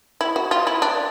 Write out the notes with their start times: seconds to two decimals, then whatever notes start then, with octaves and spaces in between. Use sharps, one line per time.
0.21 E4
0.36 F#4
0.51 F4
0.67 E4
0.82 D4